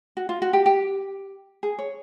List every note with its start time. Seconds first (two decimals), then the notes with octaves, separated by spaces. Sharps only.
0.17 F#4
0.29 F4
0.42 F#4
0.53 G4
0.66 G4
1.63 G#4
1.79 C#5